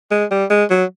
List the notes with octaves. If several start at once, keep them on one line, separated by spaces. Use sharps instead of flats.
G#3
G3
G#3
F#3